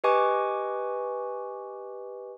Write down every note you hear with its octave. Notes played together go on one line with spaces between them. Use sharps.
G4 B4 D#5 G#5 C#6 D6